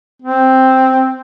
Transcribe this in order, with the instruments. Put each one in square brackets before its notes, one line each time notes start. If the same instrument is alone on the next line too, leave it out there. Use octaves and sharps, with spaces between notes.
[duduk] C4